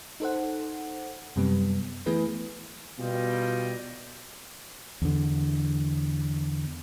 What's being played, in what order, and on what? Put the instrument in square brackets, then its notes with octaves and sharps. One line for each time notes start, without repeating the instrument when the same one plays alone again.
[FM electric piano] D#4 A4 C5 F#5
F#2 C3 G3 B3
E3 A3 B3 E4 G#4 B4
[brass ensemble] B2 G3 F4 D#5 G5
[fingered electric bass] E2 D3